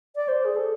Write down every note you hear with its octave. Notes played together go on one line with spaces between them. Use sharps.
D5
C5
G#4
A4